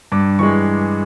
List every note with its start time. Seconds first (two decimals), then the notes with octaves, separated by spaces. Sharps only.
0.12 G2 D6
0.39 E3 G#3 C#6